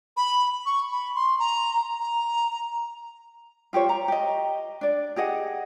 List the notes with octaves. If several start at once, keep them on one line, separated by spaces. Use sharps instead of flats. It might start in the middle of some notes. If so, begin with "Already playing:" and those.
B5
C#6
B5
C6
A#5
A#5
F4 G4 C5 C#5
A#5
G4 D#5
D4 D5
G4 G#4 D#5 F#5